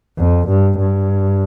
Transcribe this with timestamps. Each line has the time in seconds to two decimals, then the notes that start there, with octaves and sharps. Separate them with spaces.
0.19 F2
0.49 G2
0.78 G2